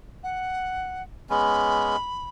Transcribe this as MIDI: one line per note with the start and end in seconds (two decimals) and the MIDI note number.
0.23 1.02 78
1.30 1.96 56
1.30 1.96 59
1.30 1.96 61
1.30 2.29 83